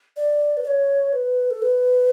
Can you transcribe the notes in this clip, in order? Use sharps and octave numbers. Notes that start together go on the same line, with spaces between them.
D5
B4
D5
C#5
B4
A4
B4